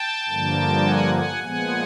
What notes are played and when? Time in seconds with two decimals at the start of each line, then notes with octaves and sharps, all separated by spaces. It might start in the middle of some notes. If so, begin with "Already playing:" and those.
Already playing: G5 A5
0.28 G2 D3 F3 A#3
0.85 F#5 G#5
1.14 F#5 G#5
1.43 A#2 F3 G#3 B3 F#5 G#5